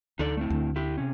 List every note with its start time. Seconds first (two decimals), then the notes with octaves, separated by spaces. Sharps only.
0.19 D2 D#4 A4 D5
0.37 A3 C4 E4
0.50 D2
0.76 E4 G4
0.98 C3 C#4